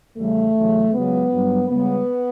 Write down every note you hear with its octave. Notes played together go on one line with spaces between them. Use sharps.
E2 C#3 G3 A3
E2 C#3 F#3
C#2 C#3 F#3 B3
G2 F#3
C#2 C#3 G3 B3